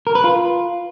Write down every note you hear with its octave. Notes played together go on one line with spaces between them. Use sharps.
A#4
B4
F4